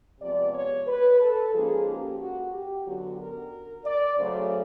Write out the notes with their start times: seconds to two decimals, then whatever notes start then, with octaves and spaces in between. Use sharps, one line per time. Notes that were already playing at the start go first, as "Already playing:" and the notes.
0.21 C3 F3 G#3 B3 D5
0.53 C#5
0.87 B4
1.20 A4
1.53 G#2 F3 A#3 C#4 G#4
1.86 G4
2.19 F#4
2.52 G4
2.85 F#2 D3 F#3 B3 F#4
3.18 A#4
3.85 D5
4.17 F#2 C#3 F#3 A3 C#4 C5